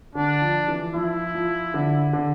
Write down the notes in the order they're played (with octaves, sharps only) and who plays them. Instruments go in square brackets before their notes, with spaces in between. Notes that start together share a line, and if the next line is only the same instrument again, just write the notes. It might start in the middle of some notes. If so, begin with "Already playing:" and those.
[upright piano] D3 [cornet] D4
[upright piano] F3
E3
[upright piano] F3 [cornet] E4
[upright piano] F3
D3
D3